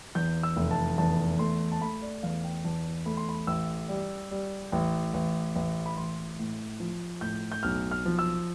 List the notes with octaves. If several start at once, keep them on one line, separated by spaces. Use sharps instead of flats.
E2 G6
E6
F1
A5
E2 A5
A3 C6
A5
A3 B5
D5
E2 F5
G5
E2 A5
A3 B5
C6
B5
A1 E6
G3
G3
A1
A1
A1
B5
A1 C6
A2
F3
A2 G6
G6
B1 F6
F6
F3
E6